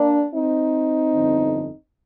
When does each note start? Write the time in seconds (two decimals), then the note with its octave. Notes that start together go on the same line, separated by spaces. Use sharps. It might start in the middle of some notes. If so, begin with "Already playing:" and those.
Already playing: A#3 D4
0.33 C4 D#4
1.13 G1 F2 D3